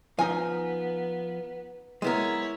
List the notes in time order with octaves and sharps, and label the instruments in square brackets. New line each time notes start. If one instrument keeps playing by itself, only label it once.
[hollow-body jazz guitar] F3 [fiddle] B3 [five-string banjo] D#4 G#5
[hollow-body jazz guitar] G#3 B3 A#4 [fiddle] E4 C#5